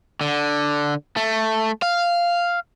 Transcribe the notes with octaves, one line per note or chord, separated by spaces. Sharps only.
D3
A3
F5